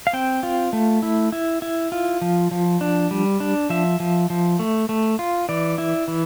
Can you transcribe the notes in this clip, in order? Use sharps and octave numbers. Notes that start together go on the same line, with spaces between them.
F5
C4 G5
F4
A3
E4
E4
E4
F4
F3
F3
D4
G3
D4
F3 E5
F3
F3
A3
A3
F4
E3 D5
E4
E3